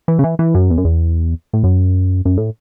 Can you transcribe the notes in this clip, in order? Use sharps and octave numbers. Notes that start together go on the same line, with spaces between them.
E3
C#3
E3
E3
F#2
E2
F#2
E2
A2
F#2
F#2
A2